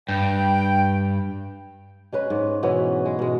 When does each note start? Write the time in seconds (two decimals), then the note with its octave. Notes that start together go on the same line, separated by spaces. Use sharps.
0.09 G2 G5
2.12 G#3 C#4 B4
2.30 G#2
2.63 B2 E3 B3 C#4
3.05 G#3
3.19 B2 G#3